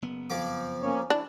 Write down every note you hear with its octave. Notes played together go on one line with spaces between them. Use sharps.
F#1 B3
F2 F3 D6
A#3 C#4 C#5
D4 E4